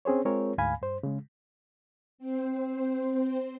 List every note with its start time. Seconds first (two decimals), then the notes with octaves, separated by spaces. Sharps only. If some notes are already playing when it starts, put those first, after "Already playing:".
0.05 C4 C#4 G#4 C5 C#5
0.25 G#3 C4 F4 G#4 A#4 C#5
0.58 D2 G#2 F5 G#5 B5
0.82 G2 C5
1.03 C#3 G#3
2.18 C4 C5